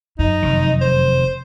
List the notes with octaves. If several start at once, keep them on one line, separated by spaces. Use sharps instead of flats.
F#2 D#4
F1 D#3
C5